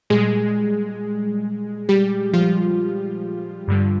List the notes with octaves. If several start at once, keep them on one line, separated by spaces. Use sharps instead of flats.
A#2 G3 G#3 G#4
G3 G4
F3 F4
G2 D3 G3